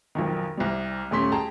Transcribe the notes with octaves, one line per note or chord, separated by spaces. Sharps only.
B1 F2 D#3
C2 C3 G3
D#1 A3 C#4 C6 B6
G#4 G5 A5 A#5